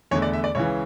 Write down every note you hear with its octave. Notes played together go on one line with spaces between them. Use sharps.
E2 D3 A3 C#5
D5
E5
D5
C#2 C#3 E3 C#5